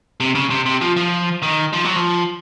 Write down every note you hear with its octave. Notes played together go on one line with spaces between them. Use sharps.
C3
C#3
C3
C3
F3
F3
D#3
F3
F#3
F3